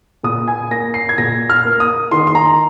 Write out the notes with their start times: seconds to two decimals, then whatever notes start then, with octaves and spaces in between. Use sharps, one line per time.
0.23 A#2 D#6
0.48 G#5
0.71 A#3 A#6
0.94 C7
1.09 G#6
1.18 A#2 A#6
1.49 F6
1.65 A#3
1.80 D#6
2.11 D#3 C6
2.27 C6
2.35 A#5